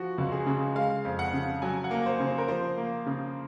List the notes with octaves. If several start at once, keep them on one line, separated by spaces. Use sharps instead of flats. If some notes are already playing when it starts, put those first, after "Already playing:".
Already playing: F3 F#4
C#2
G#4
C#3
G#3 F5
F2
F#5
C#3
F#3 G#5
F#5
A#3
C5
C#3
C5
A#4
F3 C5
A#3
C#3